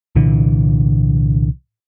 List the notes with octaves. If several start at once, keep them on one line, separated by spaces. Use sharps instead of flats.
C2 A#2 D3 E3